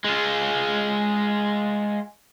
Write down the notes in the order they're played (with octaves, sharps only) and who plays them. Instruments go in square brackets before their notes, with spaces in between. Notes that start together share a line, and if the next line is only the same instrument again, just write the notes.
[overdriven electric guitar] G#3 F4